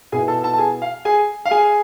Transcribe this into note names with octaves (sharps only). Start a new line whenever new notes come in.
B2 B3 E4 G#4 G#5
A4 A5
A4 A5
A5
G#4 G#5
F5
G#4 G#5
F5
G#4 G#5